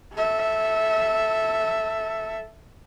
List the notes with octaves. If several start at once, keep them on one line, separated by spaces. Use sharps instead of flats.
A4 E5